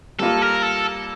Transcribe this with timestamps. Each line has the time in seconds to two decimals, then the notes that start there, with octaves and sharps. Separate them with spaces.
0.19 G3 A#3 F4 A4
0.42 A#4
0.62 A4